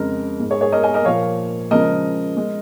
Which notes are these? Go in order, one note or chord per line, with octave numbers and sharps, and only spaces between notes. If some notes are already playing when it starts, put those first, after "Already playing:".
Already playing: F2 C#3 G#3 A#4
G#2 G#3
G#4 C#5
G#4 C#5
A#4 D#5
D#5 G#5
A#4 D#5
A#2 F3 A#3 C#5 F5
C#3 F3 G#3 A#4 D#5
G#3